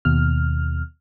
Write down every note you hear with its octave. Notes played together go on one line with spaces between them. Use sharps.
D#2 B2 F6